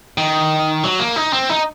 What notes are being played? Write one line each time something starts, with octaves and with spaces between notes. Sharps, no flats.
D#3
F#3
A#3
D#4
C4
D#4